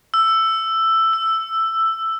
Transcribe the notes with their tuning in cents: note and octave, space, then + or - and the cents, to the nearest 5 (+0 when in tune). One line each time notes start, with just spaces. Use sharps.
E6 +10
E6 +5